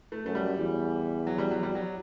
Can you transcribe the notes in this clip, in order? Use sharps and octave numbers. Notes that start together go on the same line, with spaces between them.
A3
F#2 A3
G3
E2
F#3
G3
F#3
G3
F#3